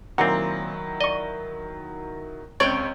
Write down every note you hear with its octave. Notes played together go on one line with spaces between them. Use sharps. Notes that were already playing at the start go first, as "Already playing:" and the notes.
A#2 D#3 F#3 C4 E4 F#5
D5 D#5 C#6
C#2 C4 C#5 D5 G5 G6